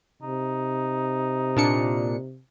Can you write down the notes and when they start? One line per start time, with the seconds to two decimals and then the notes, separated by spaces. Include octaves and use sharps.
0.22 C3 D#4
1.57 A#2 D4 C#7